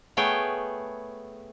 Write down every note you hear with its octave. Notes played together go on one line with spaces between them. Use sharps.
A3 B3 G#4 C#5 G5